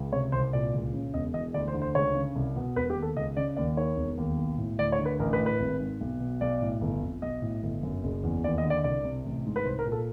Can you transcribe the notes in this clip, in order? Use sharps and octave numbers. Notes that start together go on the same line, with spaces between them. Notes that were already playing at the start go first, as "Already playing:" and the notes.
Already playing: C#2
C3 C#5
C2 C5
A#2 D5
C#2
C#3
E1 D#5
E2 D#5
D2 D5
C5
D3
C5
C#2 C#5
C#3
C2
B2
E1 B4
G4
D#2
A4
C#2 D#5
C#3 D5
D#2 D5
D#3 C#5
E1
D#2
B1
A2
D2 D5
C#5
D3
B4
A1 A#4
B4
A2
B4
G#1
G#2
B1
B2
B1 D5
A2
G1
F2
B1 D#5
A2
G1
F#2
F#1
E2
D#2 D5
D#5
D3
D5
C2 D5
C3
A1
G#2
B4
C2 C5
A#4
A#2
A4